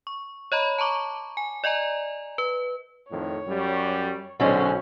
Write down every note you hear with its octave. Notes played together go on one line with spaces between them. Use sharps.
C#6
C#5 D#5 A#5 B5
A5 A#5 C#6 D6
G#5
D5 D#5 G#5 A#5
B4
F2 A2 D#3 C#5
F#2 G3
B1 D3 F#3 G#3 C#4 C5